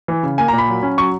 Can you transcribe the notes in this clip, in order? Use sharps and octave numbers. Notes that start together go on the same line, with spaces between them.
E3
C#3
A#3 G#5
A#5
A#2
B5
F#3
C#4
F#3 C#6